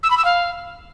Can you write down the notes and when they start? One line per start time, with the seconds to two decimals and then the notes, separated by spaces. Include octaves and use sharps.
0.03 E6
0.10 B5
0.17 E6
0.25 F5